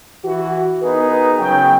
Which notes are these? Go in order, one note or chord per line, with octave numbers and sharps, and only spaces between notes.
E3 F#4
B3 D#4 G#4 A#4 B4
C#3 F#3 B3 G5